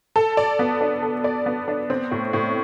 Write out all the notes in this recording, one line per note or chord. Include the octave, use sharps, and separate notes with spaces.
A4
D5
B3
D4
A4
D5
B3
D4
C4
A2
A2